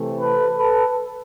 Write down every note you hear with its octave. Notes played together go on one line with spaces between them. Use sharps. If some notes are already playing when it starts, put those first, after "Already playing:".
Already playing: C3 E3 A3 C4
A4 B4
A4 B4